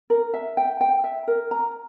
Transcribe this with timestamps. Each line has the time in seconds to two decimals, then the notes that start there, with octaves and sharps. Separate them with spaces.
0.10 A#4
0.34 E5
0.57 G5
0.81 G5
1.04 E5
1.28 A#4
1.51 A#5